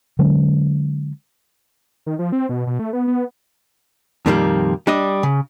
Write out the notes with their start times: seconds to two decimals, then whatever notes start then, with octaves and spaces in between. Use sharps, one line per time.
0.19 D3 F#3 G#3 C#4
2.06 D#3
2.19 F3
2.32 C4
2.49 B2
2.67 B2
2.79 A3
2.93 B3
3.07 B3
4.26 F2 A#2 D#3 G3 G#3 A#3
4.87 G3 D4 D5 D#5
5.23 C#3